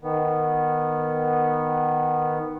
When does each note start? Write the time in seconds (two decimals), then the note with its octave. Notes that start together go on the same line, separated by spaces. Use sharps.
0.02 D#3 B3